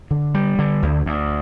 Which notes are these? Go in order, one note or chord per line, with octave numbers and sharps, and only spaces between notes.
D3
G3
D3
D2
D2